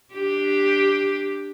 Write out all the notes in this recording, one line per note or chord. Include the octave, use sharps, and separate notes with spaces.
D4 G4